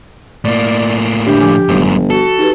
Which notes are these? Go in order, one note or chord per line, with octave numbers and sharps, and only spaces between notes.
A2 A#3 D5
D3 D4 G4 E5
D3 F3 G#5 D6
G1 F#2 A2
F#4 A4
D#4 G4 B4